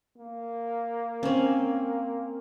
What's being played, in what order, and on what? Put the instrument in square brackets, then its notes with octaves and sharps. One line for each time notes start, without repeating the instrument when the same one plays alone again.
[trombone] A#3
[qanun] C4 C#4